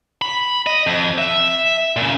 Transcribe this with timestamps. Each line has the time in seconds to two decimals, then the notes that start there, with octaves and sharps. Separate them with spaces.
0.22 B5
0.67 D#5
0.87 F2
1.18 E5
1.97 A#2 C#3